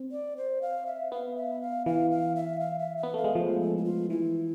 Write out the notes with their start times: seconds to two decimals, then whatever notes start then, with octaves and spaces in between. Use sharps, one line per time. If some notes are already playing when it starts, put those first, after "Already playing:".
Already playing: C4
0.11 D5
0.37 C5
0.62 F5
0.86 E5
1.12 B3 F5
1.36 E5
1.62 F5
1.86 E3 F5
2.11 F5
2.35 E5
2.60 F5
2.79 E5
2.97 E5
3.03 B3
3.14 A3 F5
3.24 G#3
3.35 F3 C5
3.61 A4
3.77 E4
3.84 F4
4.10 E3 E4